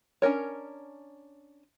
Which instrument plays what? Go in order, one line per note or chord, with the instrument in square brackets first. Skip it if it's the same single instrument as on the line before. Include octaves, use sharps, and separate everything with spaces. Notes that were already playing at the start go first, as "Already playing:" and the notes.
[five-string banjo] C#4 D4 A#4 C#5